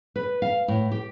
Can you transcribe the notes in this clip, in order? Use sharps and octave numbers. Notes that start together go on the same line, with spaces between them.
B4
F5
A2
G4